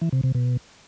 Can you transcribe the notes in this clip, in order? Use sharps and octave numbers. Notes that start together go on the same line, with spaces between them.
E3
C3
C3
B2